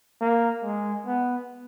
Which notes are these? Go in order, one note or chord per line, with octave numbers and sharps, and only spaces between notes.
A#3
G#3
B3